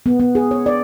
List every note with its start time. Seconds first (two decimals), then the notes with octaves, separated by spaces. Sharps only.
0.06 B3
0.20 B3
0.35 G#4
0.51 C#5
0.66 D5